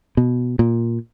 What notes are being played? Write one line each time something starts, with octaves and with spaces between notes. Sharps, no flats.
B2
A#2